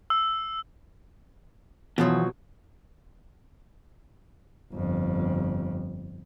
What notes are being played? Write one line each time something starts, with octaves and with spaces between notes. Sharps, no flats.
E6
E2 B2 F3 F#3
G1 F2